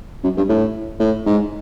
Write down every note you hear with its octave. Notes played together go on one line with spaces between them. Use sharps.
F#2
G2
A2
A2
G#2